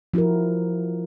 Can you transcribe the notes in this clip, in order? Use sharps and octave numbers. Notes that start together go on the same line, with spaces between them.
F3 E4 F#4 G4 A#4